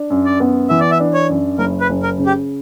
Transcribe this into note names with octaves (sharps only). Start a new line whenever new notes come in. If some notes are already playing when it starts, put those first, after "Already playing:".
Already playing: D4
F#2
D5
B3
E3 E5
D5
E5
D4
C#5
F#2
F#1 A#4
B4
F#1
A#4
C#3
G4